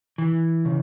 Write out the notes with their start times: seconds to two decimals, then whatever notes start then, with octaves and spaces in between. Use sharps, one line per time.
0.18 E3
0.65 C#3